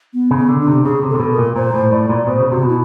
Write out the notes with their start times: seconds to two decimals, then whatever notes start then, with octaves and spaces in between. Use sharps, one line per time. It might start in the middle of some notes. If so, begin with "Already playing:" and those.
0.14 B3
0.31 C#3
0.37 B3
0.49 D3
0.60 D4
0.67 C3
0.84 C#3 G#4
1.03 C3
1.09 A4
1.14 C3
1.20 B2
1.32 A#4
1.38 A#2
1.56 A#2 C5
1.74 A2
1.92 A2 D5
2.09 A#2
2.27 B2 C5
2.40 C#3
2.51 C3 F#4
2.63 B2
2.69 E4